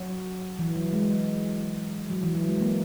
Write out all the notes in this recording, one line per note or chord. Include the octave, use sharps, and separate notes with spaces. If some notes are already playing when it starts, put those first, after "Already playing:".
Already playing: F#3
E3
F#3
G#3
F#3
E3
F#3
G#3
A#3